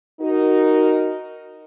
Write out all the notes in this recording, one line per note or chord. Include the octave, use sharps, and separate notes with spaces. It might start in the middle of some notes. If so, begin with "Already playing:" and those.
D#4 F#4 A#4